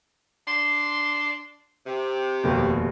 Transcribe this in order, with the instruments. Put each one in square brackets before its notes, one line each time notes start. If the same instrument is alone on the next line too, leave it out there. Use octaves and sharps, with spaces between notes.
[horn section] D4 C6
C3
[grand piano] F1 D#2 B2